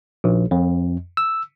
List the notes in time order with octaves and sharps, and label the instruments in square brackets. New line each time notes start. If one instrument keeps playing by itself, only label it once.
[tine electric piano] A#1
F2
E6